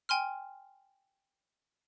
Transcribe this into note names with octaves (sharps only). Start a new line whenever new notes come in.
G5 G#5 C6 F6